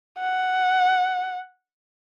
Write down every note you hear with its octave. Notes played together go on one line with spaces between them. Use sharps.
F#5